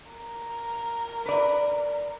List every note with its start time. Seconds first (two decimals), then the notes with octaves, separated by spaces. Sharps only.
0.11 A#4
1.26 B4 D5